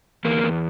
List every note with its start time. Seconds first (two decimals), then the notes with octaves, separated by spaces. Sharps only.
0.25 E2 A#3
0.44 E2